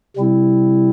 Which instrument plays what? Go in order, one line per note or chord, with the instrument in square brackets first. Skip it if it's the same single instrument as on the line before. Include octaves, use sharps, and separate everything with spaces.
[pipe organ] C3 G3 C4 E4